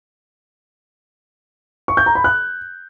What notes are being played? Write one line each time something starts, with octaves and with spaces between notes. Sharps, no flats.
C#6
G6
A#5
B5
F#6